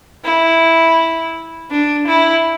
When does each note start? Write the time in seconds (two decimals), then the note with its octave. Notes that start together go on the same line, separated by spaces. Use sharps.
0.25 E4
1.71 D4
2.07 E4